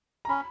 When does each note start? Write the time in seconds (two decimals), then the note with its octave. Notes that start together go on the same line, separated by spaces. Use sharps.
0.25 A#5
0.29 C#4 B5